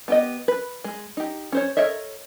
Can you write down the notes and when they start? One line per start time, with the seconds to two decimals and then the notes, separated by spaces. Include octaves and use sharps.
0.08 B3 G4 D#5
0.48 B4
0.84 G#3
1.17 D#4 G4
1.52 C#4 C5 C#5
1.77 A4 A#4 C#5 D#5 E5